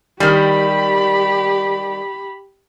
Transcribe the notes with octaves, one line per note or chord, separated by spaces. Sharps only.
D#3 G3 G4 B5